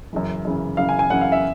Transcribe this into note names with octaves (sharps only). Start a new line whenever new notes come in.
F#2 C#3 E3
F#2 C#3 E3
F#2 C#3 E3 F5
G#5
G#5
F#2 C#3 E3 F#5
F5
E5